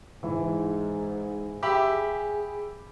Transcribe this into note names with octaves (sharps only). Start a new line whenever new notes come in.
G#2 E3
G4 G#4 E5 B5